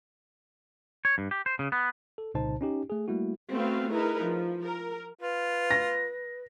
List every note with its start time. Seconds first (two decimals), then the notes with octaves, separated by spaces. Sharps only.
1.05 C#5
1.18 G2
1.31 G4
1.46 C5
1.59 C#3
1.72 B3
2.18 A4
2.34 C2 A#2 C#3 D#4 C5 A5
2.61 C#4 D#4 G4
2.90 A3 G#4
3.08 G3 A3 A#3 E4 F#4
3.51 A3 B3 C4 F#4 B4 F5
3.92 D#4 E4 G#4 A#4 B4
4.22 F3
4.63 A#4
5.21 F4 B4
5.71 A#6